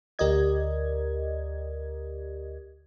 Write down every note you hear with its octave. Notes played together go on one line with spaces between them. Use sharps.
D2 G4 A#4 D5 D#5 G#6